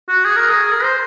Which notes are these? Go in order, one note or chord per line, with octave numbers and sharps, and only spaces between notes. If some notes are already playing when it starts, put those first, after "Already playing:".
F#4
G#4
A#4
G#4
A#4
C5